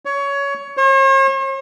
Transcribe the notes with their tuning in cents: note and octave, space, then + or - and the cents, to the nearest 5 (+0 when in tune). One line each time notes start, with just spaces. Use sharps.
C#5 +20
C#5 -45